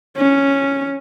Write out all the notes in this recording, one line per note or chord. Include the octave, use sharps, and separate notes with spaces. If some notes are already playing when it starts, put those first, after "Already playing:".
C#4